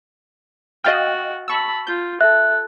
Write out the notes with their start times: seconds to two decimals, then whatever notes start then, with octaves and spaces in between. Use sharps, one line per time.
0.84 F#4 D#5 F5 G5 F6 A6
1.48 A5 B5 C#6 E6
1.87 F4 G6
2.21 A4 E5 F#6